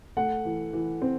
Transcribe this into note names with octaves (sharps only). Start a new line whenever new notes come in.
A3 F#5
E3
E3
C4